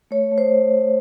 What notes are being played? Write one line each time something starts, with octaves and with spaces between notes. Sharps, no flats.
A3 C#5
A3
C5